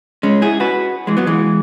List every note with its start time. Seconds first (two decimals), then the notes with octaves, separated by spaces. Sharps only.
0.23 G#3 C#4
0.42 E4 G#4
0.60 F#4 B4
1.07 E3 G#3
1.17 F#3 B3
1.27 E3 G#3